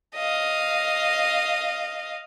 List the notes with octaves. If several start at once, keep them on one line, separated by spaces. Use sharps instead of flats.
D#5 F5